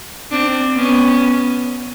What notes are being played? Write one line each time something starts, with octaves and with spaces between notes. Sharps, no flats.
C4 D4
B3 C#4